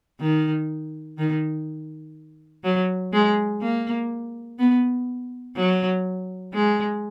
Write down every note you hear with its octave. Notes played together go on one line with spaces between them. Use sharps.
D#3
D#3
F#3
G#3
A#3
B3
F#3
G#3